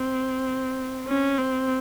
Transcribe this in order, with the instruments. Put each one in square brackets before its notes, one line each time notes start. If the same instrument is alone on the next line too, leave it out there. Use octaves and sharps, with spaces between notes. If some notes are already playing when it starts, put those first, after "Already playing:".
Already playing: [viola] C4
C#4
C4